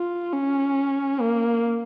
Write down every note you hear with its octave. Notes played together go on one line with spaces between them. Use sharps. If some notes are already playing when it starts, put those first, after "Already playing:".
Already playing: F4
C#4
A#3